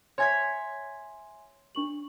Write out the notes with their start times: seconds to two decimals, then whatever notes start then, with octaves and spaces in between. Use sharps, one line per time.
0.18 C#5 E5 G#5 C6 G#6 B6
1.75 D4 C#6 F#7